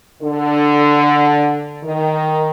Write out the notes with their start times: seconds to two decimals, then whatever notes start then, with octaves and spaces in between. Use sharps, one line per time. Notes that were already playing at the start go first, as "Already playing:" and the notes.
0.22 D3
1.84 D#3